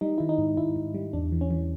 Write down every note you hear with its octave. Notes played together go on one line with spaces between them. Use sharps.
G3 D#4
D#3 E4
D#4
G#2
G#2 E4
G#2
G3
E2 D4
E3
C#4
E3